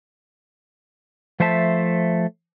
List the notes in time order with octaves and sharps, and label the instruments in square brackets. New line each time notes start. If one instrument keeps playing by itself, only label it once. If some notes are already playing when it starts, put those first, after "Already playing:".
[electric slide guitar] F3 A3 C5 E5 A5